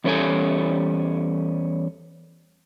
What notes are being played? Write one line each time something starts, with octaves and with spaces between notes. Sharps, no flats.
E2 G3 C#4 E4 A4 G#5